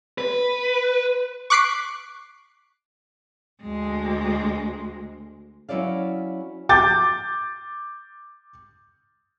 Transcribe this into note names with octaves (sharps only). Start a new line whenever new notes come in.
B4
C#6 D6 F#6 B6 C7 D7
D2 G#3
F#3 C#4 E4 C#5 D5 F5
D6 G6 A6